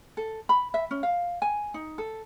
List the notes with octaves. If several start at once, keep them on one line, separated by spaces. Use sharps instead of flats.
A4
B5
E5
C#4
F5
G#5
D#4
A4